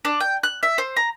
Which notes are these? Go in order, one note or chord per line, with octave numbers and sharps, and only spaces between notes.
D4
G5
F#6
E5
C5
A#5